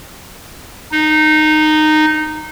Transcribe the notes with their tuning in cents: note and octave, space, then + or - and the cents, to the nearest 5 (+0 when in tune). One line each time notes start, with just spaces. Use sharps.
D#4 -15